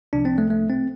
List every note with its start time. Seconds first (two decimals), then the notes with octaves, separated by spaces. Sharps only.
0.13 C2 C3 F3 D4
0.25 C4
0.38 A3
0.50 A3
0.69 C4